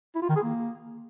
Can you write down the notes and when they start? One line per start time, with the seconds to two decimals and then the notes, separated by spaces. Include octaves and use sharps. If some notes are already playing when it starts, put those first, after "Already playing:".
0.15 E4
0.22 F4
0.29 D#3
0.36 G#4
0.43 A#3